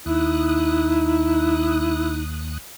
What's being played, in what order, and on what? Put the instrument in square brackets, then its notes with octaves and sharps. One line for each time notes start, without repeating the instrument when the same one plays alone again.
[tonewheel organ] D#2 D#6 F#6 [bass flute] D#4 [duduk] E4